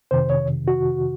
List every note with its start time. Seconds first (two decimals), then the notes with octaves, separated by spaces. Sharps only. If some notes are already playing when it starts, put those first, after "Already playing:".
0.11 F2 C3 D#3 C5
0.30 C#5
0.68 F#4